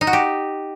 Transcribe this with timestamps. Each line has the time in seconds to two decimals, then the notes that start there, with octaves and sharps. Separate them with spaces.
0.01 D#4
0.07 F#4
0.13 G4